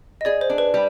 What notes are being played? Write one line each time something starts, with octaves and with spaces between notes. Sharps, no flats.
D#5
G#4 D5
C5
D4
B4
G3